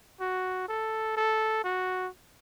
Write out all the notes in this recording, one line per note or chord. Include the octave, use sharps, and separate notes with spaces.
F#4
A4
A4
F#4